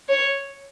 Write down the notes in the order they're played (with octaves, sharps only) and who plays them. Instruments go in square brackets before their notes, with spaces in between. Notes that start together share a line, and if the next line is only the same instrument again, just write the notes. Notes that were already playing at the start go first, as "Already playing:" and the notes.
[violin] C#5